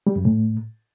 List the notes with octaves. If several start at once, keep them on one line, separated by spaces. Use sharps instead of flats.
G3
F#2
A2